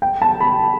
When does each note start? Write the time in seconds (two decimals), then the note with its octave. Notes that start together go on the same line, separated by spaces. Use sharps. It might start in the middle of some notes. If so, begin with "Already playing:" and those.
0.02 G5
0.22 A5
0.40 B5